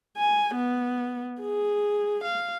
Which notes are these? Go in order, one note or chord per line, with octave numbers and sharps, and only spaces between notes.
G#5
B3
G#4
F5